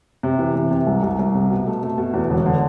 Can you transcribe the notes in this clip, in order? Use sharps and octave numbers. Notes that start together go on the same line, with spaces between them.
C3
E3
C3
C3
C2
C2
C2
C3
B2
A3
A3
B2
E2
E1
D3